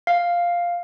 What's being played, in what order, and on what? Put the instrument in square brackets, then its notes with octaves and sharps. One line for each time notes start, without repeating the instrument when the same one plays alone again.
[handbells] F5